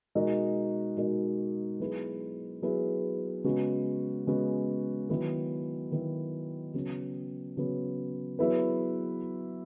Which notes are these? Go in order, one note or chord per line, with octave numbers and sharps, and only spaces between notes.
B2 G#3 D#4 F#4 A#4
B2 G#3 D#4 F#4 A#4
F#3 B3 E4 G#4 B4
F#3 B3 E4 G#4 B4
C#3 G#3 B3 F#4
C#3 G#3 B3 F#4
D#3 F#3 B3 E4
D#3 F#3 B3 E4
C#3 F#3 B3
C#3 F#3 B3
F#3 B3 E4 G#4 B4